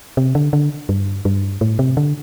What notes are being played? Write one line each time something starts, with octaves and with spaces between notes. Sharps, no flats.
C3
D3
D3
G2
G2
A2
C3
D3